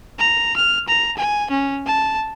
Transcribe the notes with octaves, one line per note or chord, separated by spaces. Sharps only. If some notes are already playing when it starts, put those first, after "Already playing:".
A#5
F6
A#5
G#5
C#4
A5